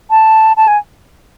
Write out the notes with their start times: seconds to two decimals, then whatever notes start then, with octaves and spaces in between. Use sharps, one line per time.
0.10 A5
0.57 A5
0.68 G#5